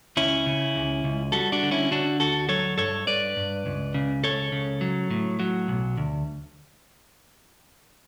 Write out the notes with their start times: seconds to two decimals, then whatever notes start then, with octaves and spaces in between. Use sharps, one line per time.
0.17 C#2 C#4 E4
0.46 C#3
0.76 C#2
1.04 C#2
1.32 G3 F#4 A4
1.52 D4 F#4
1.63 D3
1.71 C#4 E4
1.91 D3 D4 F#4
2.20 D2 F#4 A4
2.49 F#3 A4 C#5
2.78 G2 A4 C#5
3.07 G2 B4 D5
3.37 G2
3.66 C#2
3.94 C#3
4.23 C#2 A4 C#5
4.52 C#3
4.81 F#3
5.11 A2
5.40 F#3
5.68 B1
5.97 D2